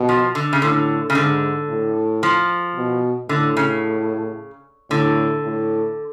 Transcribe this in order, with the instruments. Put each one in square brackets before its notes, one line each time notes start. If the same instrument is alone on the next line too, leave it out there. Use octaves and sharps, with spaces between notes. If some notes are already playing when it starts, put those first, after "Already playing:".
Already playing: [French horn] B2
[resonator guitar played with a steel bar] F3
D3
C#3
[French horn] A2 [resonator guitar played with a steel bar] D3
[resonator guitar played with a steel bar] C#3
[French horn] G#2 [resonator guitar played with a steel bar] D3
[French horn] A2
[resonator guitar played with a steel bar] F3
[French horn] B2
[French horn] A2 [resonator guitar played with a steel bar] D3
[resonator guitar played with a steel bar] C#3
[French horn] A2 [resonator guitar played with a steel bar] D3
[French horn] A2